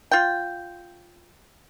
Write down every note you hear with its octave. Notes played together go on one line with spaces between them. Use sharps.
F4 G5